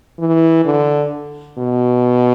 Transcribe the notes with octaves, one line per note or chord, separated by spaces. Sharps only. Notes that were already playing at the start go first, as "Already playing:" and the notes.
E3
D3
B2